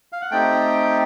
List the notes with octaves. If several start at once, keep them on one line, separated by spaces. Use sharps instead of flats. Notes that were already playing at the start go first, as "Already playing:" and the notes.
F5
F#5
A3 C4 D#4 G4 G5